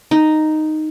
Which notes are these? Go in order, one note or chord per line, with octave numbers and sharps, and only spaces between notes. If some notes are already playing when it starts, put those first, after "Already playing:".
D#4